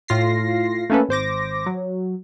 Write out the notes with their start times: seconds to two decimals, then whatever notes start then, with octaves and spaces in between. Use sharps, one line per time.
0.08 A2 F4 A#6 C7
0.90 A3 A#3 C#4 A4 B4
1.09 G#1 C5 D6 A#6
1.66 F#3